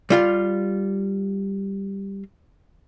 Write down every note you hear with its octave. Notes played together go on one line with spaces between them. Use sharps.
G3 F4 F5